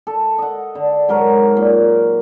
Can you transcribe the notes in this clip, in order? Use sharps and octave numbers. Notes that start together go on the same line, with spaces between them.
A4
D#5 F#5
D3
G#2 F#3 A#4
A#2